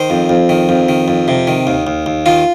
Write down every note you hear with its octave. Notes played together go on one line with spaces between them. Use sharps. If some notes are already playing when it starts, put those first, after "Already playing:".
Already playing: D#3 C5
F2
F2
D#3
F2
D#3
F2
C3
D#3
D#2
D#2
D#2
D#3 F4